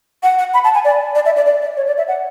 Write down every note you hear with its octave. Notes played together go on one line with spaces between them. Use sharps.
F#5
F#5
B5
A5
G#5
D5
D5
E5
D5
D5
D5
C#5
D5
E5
F#5